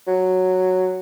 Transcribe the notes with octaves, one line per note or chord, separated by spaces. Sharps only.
F#3